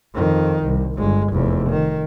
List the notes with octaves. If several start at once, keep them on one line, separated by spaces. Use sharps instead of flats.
F2 D#3
C2
G1 G#3
F1 E2
D#3